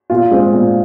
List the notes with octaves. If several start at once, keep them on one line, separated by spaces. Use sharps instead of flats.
A#2 F4
G#3 C4
A#2